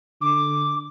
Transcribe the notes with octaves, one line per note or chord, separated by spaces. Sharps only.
D3 D6